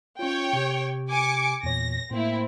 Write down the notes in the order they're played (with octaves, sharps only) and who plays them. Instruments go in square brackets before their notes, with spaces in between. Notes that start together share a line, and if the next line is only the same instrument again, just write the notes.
[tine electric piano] C#4 F4 [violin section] C#5 G5
[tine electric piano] C3 G4
[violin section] G#5 D6 C#7
[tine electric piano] E2 A#2 C#5 [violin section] A#6
[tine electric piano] A2 A#3 [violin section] C4 E4